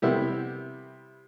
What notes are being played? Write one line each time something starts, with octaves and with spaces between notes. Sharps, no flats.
C3 G3 B3 E4 G4